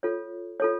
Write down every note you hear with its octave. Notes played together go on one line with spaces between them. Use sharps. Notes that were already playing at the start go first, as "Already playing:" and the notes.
F4 A4 C#5
F4 A4 C#5